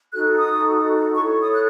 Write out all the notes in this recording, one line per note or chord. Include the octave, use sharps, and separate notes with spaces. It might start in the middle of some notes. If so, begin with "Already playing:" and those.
D#4 F#4 A4 F#6
D#6
E4 A4 C#5 C#6
D#6
F#6